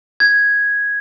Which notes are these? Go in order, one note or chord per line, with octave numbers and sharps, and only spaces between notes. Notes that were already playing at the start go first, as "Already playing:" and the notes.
G#6